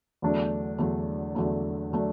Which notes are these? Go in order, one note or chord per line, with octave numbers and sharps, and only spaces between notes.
E2 D3 F#3 A3 D4
E2 D3 F#3 A3 D4
E2 D3 F#3 A3 D4
D3 F#3 A3 D4